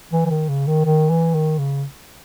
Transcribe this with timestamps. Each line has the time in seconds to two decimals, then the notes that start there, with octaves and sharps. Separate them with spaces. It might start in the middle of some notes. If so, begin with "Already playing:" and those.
0.12 E3
0.26 E3
0.30 D#3
0.49 C#3
0.67 D#3
0.85 D#3
1.10 E3
1.34 D#3
1.59 C#3